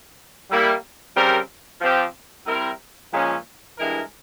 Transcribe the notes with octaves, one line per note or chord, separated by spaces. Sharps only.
G3 A#3 E4
C#3 G3 C4 G4 A#4
F3 C4 G4
G3 C4 E4 A#4
A#2 F3 G#3 C#4
G2 E3 G#3 E4 A#4